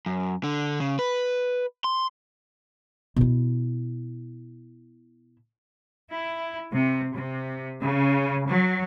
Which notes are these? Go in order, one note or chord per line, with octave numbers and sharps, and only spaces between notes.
F#2
D3
C#3
B4
C6
B2 E4
E4
C3
C3
C#3
F#3